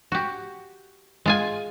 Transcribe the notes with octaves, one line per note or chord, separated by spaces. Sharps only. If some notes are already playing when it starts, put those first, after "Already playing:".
F#4 G4
G#3 F4 G#5